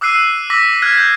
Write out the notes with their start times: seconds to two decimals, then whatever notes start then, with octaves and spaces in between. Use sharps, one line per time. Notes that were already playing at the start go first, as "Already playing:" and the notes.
0.01 D6 E6 F#6 C7 D#7
0.50 D6 E6 A#6 B6
0.82 F6 F#6 G#6 B6
0.97 G6